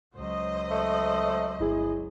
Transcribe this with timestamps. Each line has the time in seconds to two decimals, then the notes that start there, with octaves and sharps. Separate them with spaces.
0.15 C#2 F#3 C5 D#5
0.71 A3
1.60 G1 E4 G#4